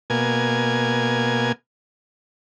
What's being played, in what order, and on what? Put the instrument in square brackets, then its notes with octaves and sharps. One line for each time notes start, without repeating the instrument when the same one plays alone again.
[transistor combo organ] B2 A#3 G#5